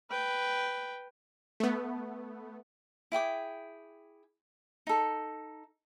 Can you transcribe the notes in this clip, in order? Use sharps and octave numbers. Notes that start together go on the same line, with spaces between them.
B4 G5
A3 B3
E4 G#4 G5 D6
D#4 A4